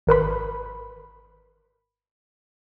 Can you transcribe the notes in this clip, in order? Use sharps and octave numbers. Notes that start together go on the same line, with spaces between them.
G#1 A#4 B4 B5